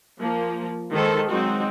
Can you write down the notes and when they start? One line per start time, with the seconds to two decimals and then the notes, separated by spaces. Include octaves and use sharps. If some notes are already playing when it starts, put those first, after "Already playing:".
0.19 F3 A#3
0.93 D#3 G#3 A4 C5
1.29 F#3 G#3 C4 D#4 F#4